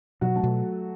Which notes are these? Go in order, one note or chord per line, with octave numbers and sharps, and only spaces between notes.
B2 F#3 F#4
A3 A4
B2